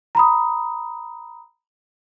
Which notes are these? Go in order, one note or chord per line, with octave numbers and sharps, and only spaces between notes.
A#5 B5 D#6